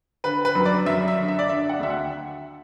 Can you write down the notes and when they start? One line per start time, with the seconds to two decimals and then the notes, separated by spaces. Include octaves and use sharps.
0.24 D3 B4
0.45 B4
0.55 F#2
0.65 D5
0.86 F#2 E5
1.08 E5
1.18 D3
1.28 E5
1.39 D5
1.49 D3 E5
1.69 F#5
1.80 D2 E5
1.90 F#5